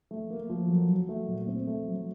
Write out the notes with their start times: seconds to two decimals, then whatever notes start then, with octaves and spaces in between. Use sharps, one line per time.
0.11 A3
0.30 A#3
0.49 F3
0.69 F#3
0.88 F#3
1.09 A3
1.28 A#2
1.47 C4
1.67 A3
1.87 F#3